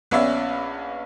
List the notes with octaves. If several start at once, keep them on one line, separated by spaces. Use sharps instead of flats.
A#1 B3 C#4 D5 E5